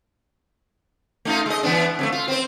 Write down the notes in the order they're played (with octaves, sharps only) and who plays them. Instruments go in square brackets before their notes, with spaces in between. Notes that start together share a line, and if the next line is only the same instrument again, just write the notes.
[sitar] A3 D#4 F4
G#3 D#5
E3 B3 D4
F2 G3 A3
F4
C4 C5